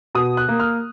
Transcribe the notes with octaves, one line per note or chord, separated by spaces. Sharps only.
B2 D#6
F#6
A#3
F6